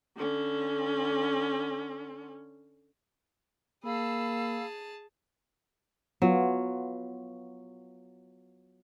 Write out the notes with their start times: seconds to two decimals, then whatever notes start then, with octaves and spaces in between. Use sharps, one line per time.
0.17 D3 C#4
3.84 A#3 G#4 F5 A5 B5 E6
6.22 F#3 B3 F4